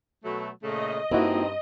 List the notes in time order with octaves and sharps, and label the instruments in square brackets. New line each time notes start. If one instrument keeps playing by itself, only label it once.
[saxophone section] B2 F#3 A3
[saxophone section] A#2 C#3 A3 [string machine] D#5
[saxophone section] G2 [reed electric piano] A#3 E4 F#4 [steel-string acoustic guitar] C4 D#4